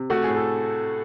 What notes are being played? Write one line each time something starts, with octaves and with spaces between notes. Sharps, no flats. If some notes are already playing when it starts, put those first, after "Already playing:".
Already playing: C3
A3 F#4
A2 G#4
A4